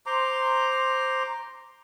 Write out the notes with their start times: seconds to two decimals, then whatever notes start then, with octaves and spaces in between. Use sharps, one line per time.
0.06 C5 A#5 C6 D6